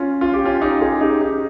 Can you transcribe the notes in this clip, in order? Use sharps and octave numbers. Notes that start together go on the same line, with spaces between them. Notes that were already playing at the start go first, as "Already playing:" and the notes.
Already playing: C#4 F4
F4
G4
C#4 F4
D#4 G4
F4 G#4
D#4 G4
D#4 G4